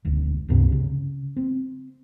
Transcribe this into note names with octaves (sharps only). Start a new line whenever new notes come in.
E1 D2
C#2 G2 C3 C4
C#3
C4